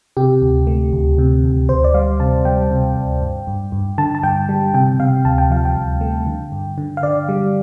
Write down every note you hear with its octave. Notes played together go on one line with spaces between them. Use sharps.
C3 G4
D2
A3
D2
C3
D2
D2 C5
D5
G3 F5
C3 A5
G3 G5
C3
D2
G2
G2
G2
D3 A5
A5
G2 G5
G3
C3 G5
C3 F5
D2 A5
G5
F3 F5
G5
D2
A3
D3
G2
D3
F5
D3 D5
G3